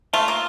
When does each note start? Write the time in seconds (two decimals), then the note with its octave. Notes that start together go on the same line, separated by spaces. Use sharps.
0.13 A3 F4
0.28 A#3